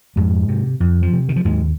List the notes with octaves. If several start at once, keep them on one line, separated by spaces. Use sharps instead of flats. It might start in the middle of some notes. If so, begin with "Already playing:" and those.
F2 G#2 G#3
C3
F2
F3
C3
D#3
F3
D#2 G#2 G#3